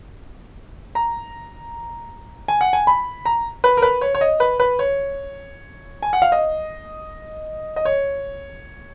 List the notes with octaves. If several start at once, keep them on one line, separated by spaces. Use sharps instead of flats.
A#5
G#5
F#5
G#5
B5
A#5
B4
A#4
B4
C#5
C#5
D#5
B4
B4
C#5
G#5
F#5
F5
D#5
D#5
C#5